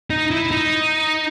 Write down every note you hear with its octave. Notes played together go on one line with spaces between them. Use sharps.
D#4
E4
D#4